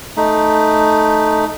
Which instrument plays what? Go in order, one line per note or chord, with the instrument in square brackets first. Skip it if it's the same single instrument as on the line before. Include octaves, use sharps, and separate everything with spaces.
[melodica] A3 D#4